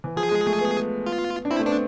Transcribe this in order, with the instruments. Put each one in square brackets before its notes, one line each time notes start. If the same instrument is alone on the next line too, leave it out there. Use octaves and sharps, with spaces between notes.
[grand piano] E3
[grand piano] F3 [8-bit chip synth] G#4
[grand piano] G#3
A3
B3
[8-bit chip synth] F4
[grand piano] D4
[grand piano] C4 [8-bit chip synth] E4
[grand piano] A3
[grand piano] B3 [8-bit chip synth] D4